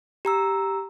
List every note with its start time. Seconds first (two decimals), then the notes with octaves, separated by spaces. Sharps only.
0.25 G4 A#5 E6